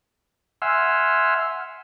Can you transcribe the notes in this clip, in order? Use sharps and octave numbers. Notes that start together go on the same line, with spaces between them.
E5 F#5 G#5 C6 E6 F6